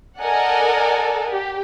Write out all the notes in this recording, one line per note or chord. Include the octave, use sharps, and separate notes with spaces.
A4 A#4 D5 D#5 F#5 G#5
G4